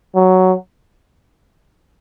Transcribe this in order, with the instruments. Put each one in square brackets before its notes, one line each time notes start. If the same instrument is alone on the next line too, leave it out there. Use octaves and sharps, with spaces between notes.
[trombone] F#3